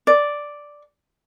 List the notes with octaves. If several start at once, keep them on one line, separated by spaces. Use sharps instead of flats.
D5